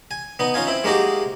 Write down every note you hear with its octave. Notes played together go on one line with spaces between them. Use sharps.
G#5
B3 D#4
C#4 D#4 F4 G#5
C4 E4
G#3 A#3 D#4 F#4 G4